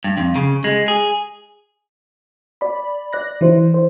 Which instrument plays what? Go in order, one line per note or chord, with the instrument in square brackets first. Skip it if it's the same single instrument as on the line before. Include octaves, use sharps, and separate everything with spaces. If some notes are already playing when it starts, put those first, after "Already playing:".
[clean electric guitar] G2
F2
C#3
G#3
G#4
[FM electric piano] D5 B5
D5 F#6 A#6
E3 E4 C5
C5